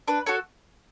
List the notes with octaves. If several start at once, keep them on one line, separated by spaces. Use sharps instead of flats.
D4 B4
F#4 A4 C#5